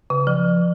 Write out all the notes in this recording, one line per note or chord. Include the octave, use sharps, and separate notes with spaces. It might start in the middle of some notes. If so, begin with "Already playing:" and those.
C#3
F3